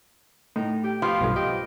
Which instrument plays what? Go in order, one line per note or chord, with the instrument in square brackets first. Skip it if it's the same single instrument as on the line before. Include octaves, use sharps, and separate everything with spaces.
[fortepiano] A2 [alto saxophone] D#4
[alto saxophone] G4
[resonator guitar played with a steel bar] F3 B3 F4 [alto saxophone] G4
[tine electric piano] B1 G2 A3
[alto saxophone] G4 [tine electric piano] D#5